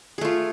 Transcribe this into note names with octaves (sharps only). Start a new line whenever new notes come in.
A3 F4 G#4